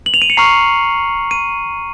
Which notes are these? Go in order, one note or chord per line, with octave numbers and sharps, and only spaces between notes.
F#7
F7
D#7
C#7
A#5 C#6 F6 C7
D#7